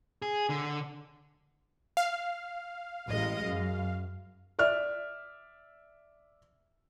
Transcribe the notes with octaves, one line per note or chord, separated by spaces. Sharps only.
G#4
D3
F5
A1 G#3 D#5
F#2
D5 E5 F6